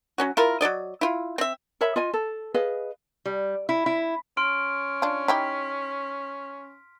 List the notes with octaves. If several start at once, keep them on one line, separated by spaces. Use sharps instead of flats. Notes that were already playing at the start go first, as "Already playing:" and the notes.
F#3 C#4 F#4
E4 F4 A#4
F#3 G3 D5 D#5
E4 F4
C4 E5
A#4 C#5 E5 B5
F4 D#5 G#5
A4
G#4 B4 D#5 F5
G3
E4
E4
C#4 C6 F6 D7
D4 F4
D#4 E4 G4 B6